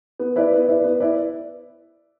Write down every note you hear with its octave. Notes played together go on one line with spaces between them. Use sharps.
B3
E4 B4 D5
B3
E4 B4 D5
B3
E4 B4 D5